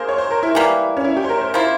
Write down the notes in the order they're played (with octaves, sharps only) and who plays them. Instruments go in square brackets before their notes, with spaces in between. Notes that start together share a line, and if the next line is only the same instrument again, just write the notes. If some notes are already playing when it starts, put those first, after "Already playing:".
Already playing: [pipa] A#3 [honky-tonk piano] G#4 A#4 C5
[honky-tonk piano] C#5
C5
A#4
E4
[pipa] E3 G3 A#3
[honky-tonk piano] C#4
E4
G4
C5
A#4
C5
[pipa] F3 A#3 E4 [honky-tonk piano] C5